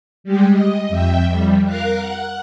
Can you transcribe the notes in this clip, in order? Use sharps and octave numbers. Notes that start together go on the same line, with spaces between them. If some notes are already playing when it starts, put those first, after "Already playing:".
G3 G#3 G4
D#5
F2 E5 G5
F2 G3
A#4 F5 F#6
F#5